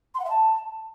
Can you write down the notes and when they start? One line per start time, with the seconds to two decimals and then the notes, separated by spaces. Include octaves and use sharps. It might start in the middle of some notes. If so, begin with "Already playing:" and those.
0.14 C6
0.20 F#5
0.25 E5
0.30 A5